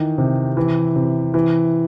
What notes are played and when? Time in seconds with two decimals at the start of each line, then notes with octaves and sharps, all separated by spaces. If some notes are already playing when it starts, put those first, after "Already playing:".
Already playing: D#3 E3 D#4
0.18 C3
0.57 E3
0.96 C3
1.34 E3